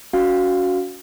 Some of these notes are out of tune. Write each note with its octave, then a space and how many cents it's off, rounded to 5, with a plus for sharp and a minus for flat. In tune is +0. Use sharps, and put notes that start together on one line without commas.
C#4 +30 F#4 -10 F5 +0